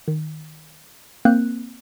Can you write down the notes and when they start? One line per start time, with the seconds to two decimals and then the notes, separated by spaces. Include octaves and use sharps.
0.08 D#3
1.25 A#3 C4 F#6 G6